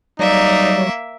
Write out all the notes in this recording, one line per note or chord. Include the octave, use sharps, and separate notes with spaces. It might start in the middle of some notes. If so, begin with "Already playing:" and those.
F#3 G3 A#3 D#4 C#5 D5 E5